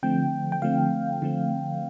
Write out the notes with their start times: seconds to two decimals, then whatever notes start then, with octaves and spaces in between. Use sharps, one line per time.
0.03 D3 F3 A3 C4 G5
0.52 G5
0.62 D3 F3 A3 C4 F5
1.22 D3 F3 A3 C4